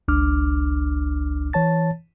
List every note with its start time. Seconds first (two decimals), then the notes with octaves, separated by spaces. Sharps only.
0.08 G1 C#2 D4 D6 F6
1.53 E3 C#5 A5 A6